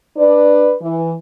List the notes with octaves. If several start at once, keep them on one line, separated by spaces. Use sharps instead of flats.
D4 B4 D5
E3